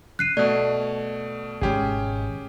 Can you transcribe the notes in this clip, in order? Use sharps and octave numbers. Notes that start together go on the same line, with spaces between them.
F#6 C7 D#7
B2 A3 D5
G#1 B2 G#3 C#4 G4 G#4